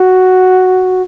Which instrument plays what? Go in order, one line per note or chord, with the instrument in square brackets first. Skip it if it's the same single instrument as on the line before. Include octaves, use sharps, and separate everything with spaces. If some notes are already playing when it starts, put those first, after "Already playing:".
Already playing: [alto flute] F#4